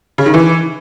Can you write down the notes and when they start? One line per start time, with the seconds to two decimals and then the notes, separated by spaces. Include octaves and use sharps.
0.18 C#3
0.26 D#3
0.34 E3